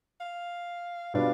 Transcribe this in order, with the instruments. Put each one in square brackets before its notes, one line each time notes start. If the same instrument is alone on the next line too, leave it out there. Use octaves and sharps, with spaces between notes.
[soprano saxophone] F5
[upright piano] B2 G3 B3 D4 F4 [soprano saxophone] F5